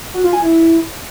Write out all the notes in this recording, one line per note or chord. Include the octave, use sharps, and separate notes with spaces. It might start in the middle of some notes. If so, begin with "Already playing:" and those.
F#4
F4
G#5
E4